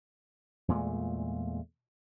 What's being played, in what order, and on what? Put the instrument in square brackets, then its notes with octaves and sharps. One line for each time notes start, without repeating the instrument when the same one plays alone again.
[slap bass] E2 A#2 G#3 A3